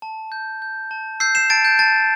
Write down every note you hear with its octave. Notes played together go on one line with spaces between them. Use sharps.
A5
G6
G6
A5
E6 G6 C7
C7 E7
A5 A6 D7
G6
A5 A6